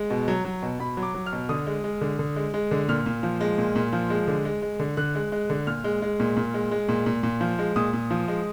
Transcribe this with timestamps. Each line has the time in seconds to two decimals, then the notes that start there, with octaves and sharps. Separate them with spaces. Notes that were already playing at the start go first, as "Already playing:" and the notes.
Already playing: G#3
0.10 B2
0.28 F#3
0.45 F#3
0.63 B2
0.79 B2 B5
0.97 F#3
1.03 D6
1.15 F#3
1.26 F6
1.33 B2
1.49 D3 D#6
1.67 G#3
1.84 G#3
2.01 D3
2.19 D3
2.36 G#3
2.54 G#3
2.71 D3
2.89 A#2 F6
3.06 A#2
3.23 F3
3.41 G#3
3.58 A#2
3.75 A#2
3.93 F3
4.10 G#3
4.28 D3
4.45 G#3
4.62 G#3
4.80 D3
4.97 D3 F#6
5.15 G#3
5.32 G#3
5.50 D3
5.67 A#2 F6
5.84 G#3
6.02 G#3
6.20 A#2
6.37 A#2
6.54 G#3
6.71 G#3
6.89 A#2
7.06 A#2
7.23 A#2
7.41 F3
7.59 G#3
7.76 A#2 D#6
7.93 A#2
8.11 F3
8.28 G#3